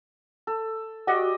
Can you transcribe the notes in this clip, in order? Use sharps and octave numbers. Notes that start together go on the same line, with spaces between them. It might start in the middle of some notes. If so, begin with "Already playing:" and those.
A4
F#4 G4 D5 D#5